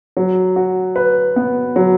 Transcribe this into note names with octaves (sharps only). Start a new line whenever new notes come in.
F#3
F#4
B4
B3
F#3